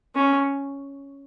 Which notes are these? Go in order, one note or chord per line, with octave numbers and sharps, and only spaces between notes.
C#4